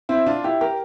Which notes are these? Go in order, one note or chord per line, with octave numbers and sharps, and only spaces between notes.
C4 E4
D4 F4
E4 G4
G4 A#4